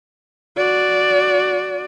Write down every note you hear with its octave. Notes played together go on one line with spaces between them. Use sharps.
F#4 D5